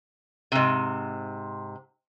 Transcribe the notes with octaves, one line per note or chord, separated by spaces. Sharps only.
G#2 C3